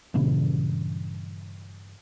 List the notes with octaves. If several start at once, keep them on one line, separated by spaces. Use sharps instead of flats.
G2 A#2 C#3 E3